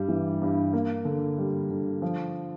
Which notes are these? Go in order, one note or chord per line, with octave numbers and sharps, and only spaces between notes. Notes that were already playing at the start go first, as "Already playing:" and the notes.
Already playing: G2 G3
E3
G2
A#3
D3
G3
D3
F3